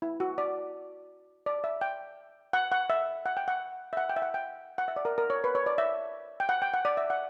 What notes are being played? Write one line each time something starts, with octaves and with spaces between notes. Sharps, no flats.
E4
F#4
D5
D5
E5
G5
F#5
F#5
E5
F#5
G5
F#5
E5
F#5
G5
E5
F#5
G5
F#5
E5
D5
A#4
A#4
C#5
B4
C#5
D5
E5
G5
F#5
G5
F#5
D5
E5
F#5